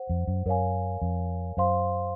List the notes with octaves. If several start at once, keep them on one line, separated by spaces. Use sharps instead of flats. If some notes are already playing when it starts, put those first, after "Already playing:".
Already playing: C5 F#5
F2
F#2
F#2 A#4 C#5 F5 G#5
F2
F#2 C5 F5 C6